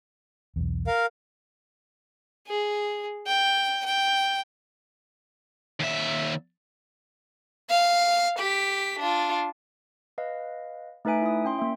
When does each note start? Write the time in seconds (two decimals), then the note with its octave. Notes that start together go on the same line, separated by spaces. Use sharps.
0.56 B1 E2
0.87 A#4 F5
2.47 G#4
3.26 G5
3.85 G5
5.80 D#2 E5
7.70 F5
8.39 G4 B6
9.00 D4 F4
10.18 B4 D#5 F5
11.05 A3 D#4 B4 E5 G#5 D7
11.22 E4 D#6
11.45 C#4 G5 C6
11.59 A#3 E5